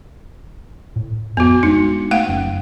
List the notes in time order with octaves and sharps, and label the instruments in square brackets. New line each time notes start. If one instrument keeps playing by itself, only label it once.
[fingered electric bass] A2
[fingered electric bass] F2 [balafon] B3 F#4
[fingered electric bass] G#3 D4 [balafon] D#4
[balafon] A3 F5 F#5
[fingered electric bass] F#1 F#2 C#4